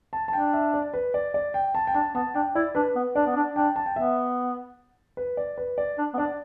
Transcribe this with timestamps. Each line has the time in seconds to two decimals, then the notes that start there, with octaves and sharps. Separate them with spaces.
0.13 A5
0.28 A5
0.33 D4 G5
0.53 E5
0.74 D5
0.94 B4
1.14 D5
1.34 D5
1.54 G5
1.75 A5
1.87 G5
1.94 D4 A5
2.15 B3 A5
2.35 D4 G5
2.55 E4 D5
2.75 D4 B4
2.95 B3
3.15 D4 D5
3.26 B3
3.36 D4
3.56 D4 G5
3.76 A5
3.86 G5
3.96 B3 E5
5.17 B4
5.37 D5
5.58 B4
5.78 D5
5.98 D4
6.14 B3
6.18 D4 D5